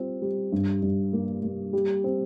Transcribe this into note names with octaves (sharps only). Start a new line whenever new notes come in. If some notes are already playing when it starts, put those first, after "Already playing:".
Already playing: G3 C4 F4
G3
G2
G2
A#3
A#3
G3
C4